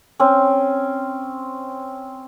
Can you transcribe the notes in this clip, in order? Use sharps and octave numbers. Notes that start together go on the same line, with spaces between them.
C4 C#4